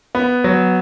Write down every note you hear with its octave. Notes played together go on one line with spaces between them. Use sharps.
B3
F#3